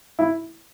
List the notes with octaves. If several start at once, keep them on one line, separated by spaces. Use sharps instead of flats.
E4